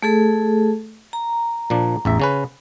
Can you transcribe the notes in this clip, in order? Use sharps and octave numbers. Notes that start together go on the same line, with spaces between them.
A3 G#4 A4
A#5
A#2 F3 D4
A1 E2 E5
C#3 C#4 B4